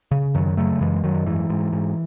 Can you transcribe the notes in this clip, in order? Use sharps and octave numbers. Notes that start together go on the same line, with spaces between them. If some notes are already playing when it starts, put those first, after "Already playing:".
C#3
F#2 D#3 F#3
C#3 F#3 A3
F#2 E3 G#3
F#2 D#3 F#3
G#2 E3
G#2
G#2